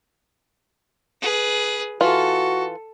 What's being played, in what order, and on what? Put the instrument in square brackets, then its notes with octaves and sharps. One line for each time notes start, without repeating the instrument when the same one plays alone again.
[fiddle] G#4 B4
[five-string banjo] E3 F4 [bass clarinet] F#4 [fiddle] A4